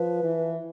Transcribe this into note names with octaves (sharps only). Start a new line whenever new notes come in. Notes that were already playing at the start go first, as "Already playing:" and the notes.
Already playing: F3 B4
E3